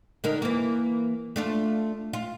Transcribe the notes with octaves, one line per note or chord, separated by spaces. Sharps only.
D3 D#4 A#4
E3 A#3
A3 D4 F4
F4